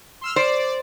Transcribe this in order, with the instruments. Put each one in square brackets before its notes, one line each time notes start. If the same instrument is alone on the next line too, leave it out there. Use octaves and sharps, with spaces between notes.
[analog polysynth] C6 E6 F6
[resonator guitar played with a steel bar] C5 [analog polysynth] D5